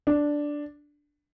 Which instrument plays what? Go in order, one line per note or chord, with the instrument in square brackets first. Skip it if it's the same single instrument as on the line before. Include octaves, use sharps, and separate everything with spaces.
[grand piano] D4